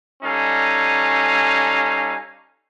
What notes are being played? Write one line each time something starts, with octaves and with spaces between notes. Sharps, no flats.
G3 C#4 D#4 A4 F5 G#5